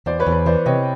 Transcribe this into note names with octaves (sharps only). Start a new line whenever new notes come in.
E2 C5 D5
B4 C#5
E2
B4
E3 C5 D5
C3 C#5 D#5